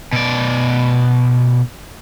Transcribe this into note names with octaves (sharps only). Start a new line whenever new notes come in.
B2 D5